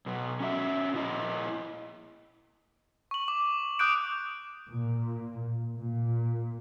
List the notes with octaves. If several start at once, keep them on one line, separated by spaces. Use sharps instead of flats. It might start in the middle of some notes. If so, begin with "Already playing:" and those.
B2 F#3
C#4 F#4 E5
A#2 E4 D#5
C#6 F#7
D6
D6 D#6 F#6 G6 D7
A#2
A#2